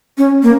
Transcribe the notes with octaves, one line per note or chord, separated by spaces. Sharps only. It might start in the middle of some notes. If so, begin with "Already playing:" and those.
C#4
A#3